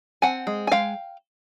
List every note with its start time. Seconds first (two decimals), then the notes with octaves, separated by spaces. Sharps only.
0.22 C4 F#5 G#5
0.47 G#3
0.67 G#5
0.72 G#3 F5 G5